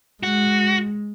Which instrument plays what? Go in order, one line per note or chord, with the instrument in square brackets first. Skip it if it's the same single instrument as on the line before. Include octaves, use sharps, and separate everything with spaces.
[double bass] G#3 [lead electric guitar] F#4